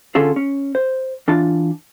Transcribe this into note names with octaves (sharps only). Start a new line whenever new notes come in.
D3 C#4 F4 G#4 A4
C#4
C5
E3 D4 F4 A5